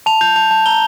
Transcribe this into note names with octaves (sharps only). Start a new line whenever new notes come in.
A5 F7
G6 F7
A5 F7
A5
A#5 G7